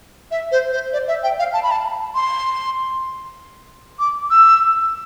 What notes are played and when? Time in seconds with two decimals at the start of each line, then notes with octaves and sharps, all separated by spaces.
0.31 E5
0.52 C5
0.72 C5
0.93 D5
1.08 E5
1.23 G5
1.39 F5
1.53 A5
1.63 B5
1.71 A5
2.15 C6
3.99 D6
4.31 E6